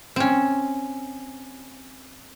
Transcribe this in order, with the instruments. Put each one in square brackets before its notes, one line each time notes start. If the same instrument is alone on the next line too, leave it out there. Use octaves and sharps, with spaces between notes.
[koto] C4 C#4